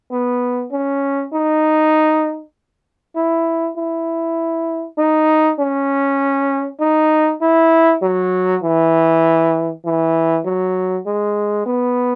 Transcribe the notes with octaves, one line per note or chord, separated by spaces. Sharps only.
B3
C#4
D#4
E4
E4
D#4
C#4
D#4
E4
F#3
E3
E3
F#3
G#3
B3